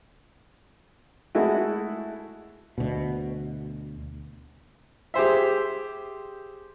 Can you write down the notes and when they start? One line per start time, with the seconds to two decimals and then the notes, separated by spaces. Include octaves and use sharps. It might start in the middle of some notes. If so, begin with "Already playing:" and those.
1.35 G#3 A3 E4 F#4
2.78 D2 B2
5.14 G4 G#4 C5 E5